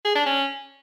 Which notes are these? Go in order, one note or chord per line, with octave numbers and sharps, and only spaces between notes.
G#4
D4
C#4